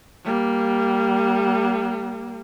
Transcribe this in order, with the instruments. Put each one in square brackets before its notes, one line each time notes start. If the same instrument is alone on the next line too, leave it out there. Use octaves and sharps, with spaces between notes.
[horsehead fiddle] G3 A#3